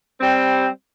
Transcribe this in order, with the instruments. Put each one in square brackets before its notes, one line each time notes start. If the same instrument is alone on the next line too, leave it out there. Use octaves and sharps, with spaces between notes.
[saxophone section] G3 C4